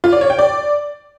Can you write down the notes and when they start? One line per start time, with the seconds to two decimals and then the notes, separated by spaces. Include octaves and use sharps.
0.04 F4
0.12 D5
0.21 C#5
0.30 G5
0.39 D5